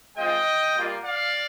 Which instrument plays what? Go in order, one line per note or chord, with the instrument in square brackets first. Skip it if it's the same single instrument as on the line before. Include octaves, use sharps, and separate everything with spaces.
[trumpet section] G#3 C4 F4 D#5 G5
G3 A#3 F4
D5 F5